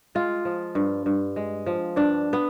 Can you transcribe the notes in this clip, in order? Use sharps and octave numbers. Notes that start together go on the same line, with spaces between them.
G#3 F4
F3
G2
G2
G#3
F3
G2 D4
B3